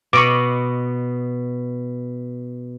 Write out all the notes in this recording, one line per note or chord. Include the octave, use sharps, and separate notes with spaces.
B2 D#5 B5 C#6 D6